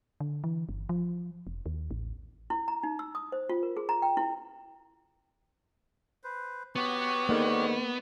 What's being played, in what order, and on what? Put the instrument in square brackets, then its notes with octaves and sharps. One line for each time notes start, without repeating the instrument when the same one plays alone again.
[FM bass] D3
E3
G1
F3
F1
D#2
A1
[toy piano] E4
A#5
D#4
E6
D#6
C5
F4
A#4
G#4
A#5
G5
E4
[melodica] B4 C5
[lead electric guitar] B3 [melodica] F#4 G4 C#5
[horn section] G#2 D3 D#3 [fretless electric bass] A#3